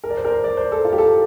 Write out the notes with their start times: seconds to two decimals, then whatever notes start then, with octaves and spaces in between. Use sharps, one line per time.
0.04 A#4
0.10 D5
0.17 C5
0.25 A#4
0.30 C5
0.44 D5
0.57 C5
0.72 A4
0.85 F4
0.92 G4
0.98 A4